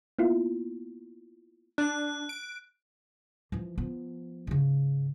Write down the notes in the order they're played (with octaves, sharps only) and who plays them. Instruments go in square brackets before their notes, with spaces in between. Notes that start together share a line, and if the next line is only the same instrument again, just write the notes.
[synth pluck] A#3 B3 E4 F4
[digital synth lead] D4 [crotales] F#6
[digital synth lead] D7
[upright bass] E3 F3
F3 B3
G#2 C#3